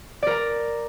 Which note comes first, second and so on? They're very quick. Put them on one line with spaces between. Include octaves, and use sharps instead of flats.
D5 A#4 A#5